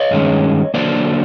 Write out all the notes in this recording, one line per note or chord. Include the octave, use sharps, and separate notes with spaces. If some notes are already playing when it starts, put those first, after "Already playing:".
Already playing: C#5 D#5
G2 D#3 G#3 C#4
D3 F#3 A#3 C5 D5